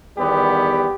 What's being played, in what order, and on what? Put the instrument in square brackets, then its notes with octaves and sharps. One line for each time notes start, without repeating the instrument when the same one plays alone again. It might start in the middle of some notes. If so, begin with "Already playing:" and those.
[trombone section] E2 D#3 G3 B3 G4